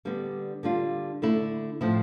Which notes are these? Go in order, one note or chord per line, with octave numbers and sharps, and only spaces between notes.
D3 G3 B3
D3 G3 D4 F4
D3 A3 E4
A2 F3 C4 E4